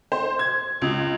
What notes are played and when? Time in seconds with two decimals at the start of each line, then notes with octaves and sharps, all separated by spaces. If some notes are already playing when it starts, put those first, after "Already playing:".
0.12 C5
0.39 G#6
0.82 C#2